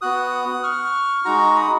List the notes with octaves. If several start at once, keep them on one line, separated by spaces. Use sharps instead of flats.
B3 F#4 D#6 F#6
C#6 F6
G#3 D#4 F#4 A#5 C#6
B5 D#6